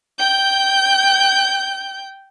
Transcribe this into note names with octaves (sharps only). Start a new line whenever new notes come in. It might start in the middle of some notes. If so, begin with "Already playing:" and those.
G5 G6